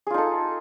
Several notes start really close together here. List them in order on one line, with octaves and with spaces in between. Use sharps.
G#4 F4 D#4 A4